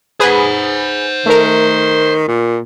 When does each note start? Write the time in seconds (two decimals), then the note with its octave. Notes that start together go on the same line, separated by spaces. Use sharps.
0.20 G#4 B4 C5 F#5
1.26 D#3 A3 A#4
2.28 A#2